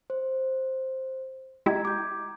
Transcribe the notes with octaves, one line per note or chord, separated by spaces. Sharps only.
C5
G#3 E4 G4 A#5 G#6
D6 G6